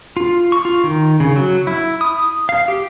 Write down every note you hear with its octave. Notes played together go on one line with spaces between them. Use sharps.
F4
C#6
F4
D#3
C#3
F#3
E4
D#6
F5
G4